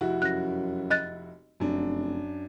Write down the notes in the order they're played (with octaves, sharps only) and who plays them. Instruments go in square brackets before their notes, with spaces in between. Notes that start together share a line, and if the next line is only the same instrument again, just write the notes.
[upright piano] F1 E4 F#4
[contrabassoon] F#2 [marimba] F#6 A#6
[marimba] D#5 F#6 A6
[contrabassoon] F1 [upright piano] F#2 D4